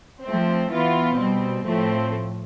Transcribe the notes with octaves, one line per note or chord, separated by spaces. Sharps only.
F3 A3 C4
E3 B3 F4
B2 G3 C4
A2 F3 A3 C4